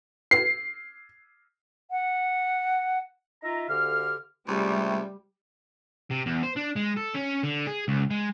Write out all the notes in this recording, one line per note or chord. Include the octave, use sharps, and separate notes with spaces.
C7
F#5
D#4 F4 E5 A#5
D2 D3 G4 F5 F6
C#2 C3 G3 A3
C3
E2
C5
D4
G#3
A4
C#4
D3
G#4
C#2
G#3